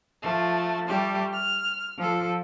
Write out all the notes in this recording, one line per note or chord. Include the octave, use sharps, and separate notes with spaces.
F3 A3
G3 A3 G4
F6
F3 A4